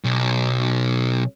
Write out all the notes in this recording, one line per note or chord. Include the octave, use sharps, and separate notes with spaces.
B1